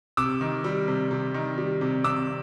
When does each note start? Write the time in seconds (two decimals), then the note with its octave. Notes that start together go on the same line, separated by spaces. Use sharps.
0.17 C3 D6 E6
0.41 D#3
0.64 G3
0.88 C3
1.11 C3
1.34 D#3
1.58 G3
1.81 C3
2.04 C3 D6 E6